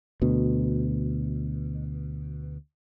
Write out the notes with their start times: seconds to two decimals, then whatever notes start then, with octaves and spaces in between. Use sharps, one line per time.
0.22 D2 B2